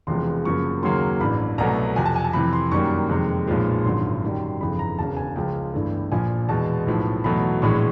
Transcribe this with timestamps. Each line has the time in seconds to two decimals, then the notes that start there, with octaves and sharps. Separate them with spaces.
0.07 E1 E2 C3 F3 G#3 C6
0.45 F#2 C#3 F3 A#3 C#6
0.82 D#2 C#3 F#3 A#3 C6
1.21 A1 G2 E3 B5
1.58 C2 B2 F#3 A3 A#5
1.96 F2 C3 F3 G#5
2.06 A5
2.16 G#5
2.24 A5
2.33 F2 C3 E3 B5
2.53 C6
2.71 F#2 D#3 G3 A#3 C#6
3.09 F2 C3 D#3 G#3
3.47 B1 A#2 F3 G#3
3.85 G#1 F#2 D3 F3 C6
4.23 F#2 D#3 G3
4.60 G1 F2 C#3 E3 B5
4.79 A#5
4.99 E1 E2 C#3 A5
5.17 G#5
5.36 C#2 C#3 F3 G#3 G5
5.73 G1 G2 E3 A3
6.12 A#1 A#2 F3 G#5
6.49 E2 B2 G#3 A5
6.86 B1 A2 F3
7.24 E2 B2 F#3 A3 B5
7.62 A#1 A2 E3 G#3 C#6